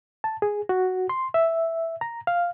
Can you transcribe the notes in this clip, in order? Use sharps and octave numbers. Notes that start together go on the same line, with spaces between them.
A5
G#4
F#4
C6
E5
A#5
F5